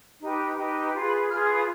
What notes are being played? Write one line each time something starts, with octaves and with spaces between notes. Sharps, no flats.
D#4 G4 B4
D#4 G4 B4
F4 G#4 B4 C6
B5
F4 G#4 B4 F6
D#6
D#6